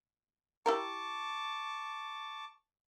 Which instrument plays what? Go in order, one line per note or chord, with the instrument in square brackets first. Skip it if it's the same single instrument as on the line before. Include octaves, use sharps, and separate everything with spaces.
[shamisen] E4 G4 A#4 [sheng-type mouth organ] A5 C#6 D6